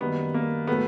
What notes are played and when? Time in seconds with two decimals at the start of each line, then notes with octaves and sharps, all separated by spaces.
0.01 F#2 D#3 G3 A#3 B3
0.34 A#3
0.67 A2 F#3 A3 B3